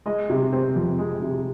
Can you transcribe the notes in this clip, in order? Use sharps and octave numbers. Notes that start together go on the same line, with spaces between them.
G#3 D#5
C3
C4 C5
F2
G#3
C3